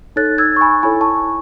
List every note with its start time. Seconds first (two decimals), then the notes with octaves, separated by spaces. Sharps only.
0.16 D#4 A4 C#5 F#6 A6
0.38 E6 G#6
0.56 C#6
0.61 G#5 B5
0.83 E4 A4 C#5 G#5 B5
1.01 A5 C#6